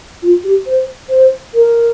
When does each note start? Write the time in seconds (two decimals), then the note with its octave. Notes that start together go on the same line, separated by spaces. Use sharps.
0.22 F4
0.44 G4
0.66 C5
1.09 C5
1.54 A#4